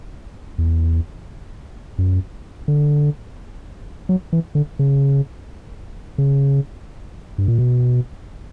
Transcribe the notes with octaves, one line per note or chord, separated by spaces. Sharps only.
E2
F#2
D3
F#3
E3
D3
C#3
C#3
G2
A#2
B2